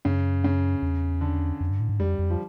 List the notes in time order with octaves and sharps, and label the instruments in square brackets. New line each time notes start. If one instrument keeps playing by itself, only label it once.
[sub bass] F#2 [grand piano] C#3
[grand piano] C#3
[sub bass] E2
[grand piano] D3
[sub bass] F2
G2
A2
G#2
[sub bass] F2 [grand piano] G3
[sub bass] F2
[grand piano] F3